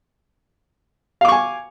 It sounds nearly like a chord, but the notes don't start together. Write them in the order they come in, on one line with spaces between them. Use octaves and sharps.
F5 D6 C#6 G#5